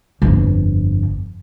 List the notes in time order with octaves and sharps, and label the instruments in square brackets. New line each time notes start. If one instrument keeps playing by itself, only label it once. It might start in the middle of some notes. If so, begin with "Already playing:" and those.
[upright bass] G1 F2